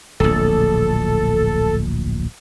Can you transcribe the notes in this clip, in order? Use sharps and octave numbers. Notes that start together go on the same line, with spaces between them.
D1 A#1 A4